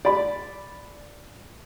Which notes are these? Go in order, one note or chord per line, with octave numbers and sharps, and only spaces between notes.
D5 B5